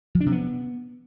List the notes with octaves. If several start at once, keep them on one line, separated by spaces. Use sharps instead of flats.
F3
D4
C3
B3